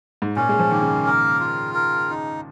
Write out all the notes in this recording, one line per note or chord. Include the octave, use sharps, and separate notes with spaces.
G#2
A#2 C#4
G#3
F3
D#3 A#3
C#3
A#4
F4
A#4
D#4